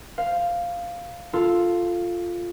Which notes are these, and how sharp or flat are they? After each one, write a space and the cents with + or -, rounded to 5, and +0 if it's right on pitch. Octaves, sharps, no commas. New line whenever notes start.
C5 +0 F5 +0
F4 +0 A4 +0